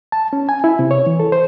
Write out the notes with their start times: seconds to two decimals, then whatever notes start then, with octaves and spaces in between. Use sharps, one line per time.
0.12 A5
0.33 C#4
0.49 G#5
0.64 E4
0.79 C3
0.91 C#5
1.07 E3
1.20 A4
1.32 C5